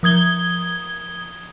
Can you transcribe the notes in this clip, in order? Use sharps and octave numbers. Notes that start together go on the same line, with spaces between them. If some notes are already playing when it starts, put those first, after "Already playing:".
F3 D#6 G#6 G7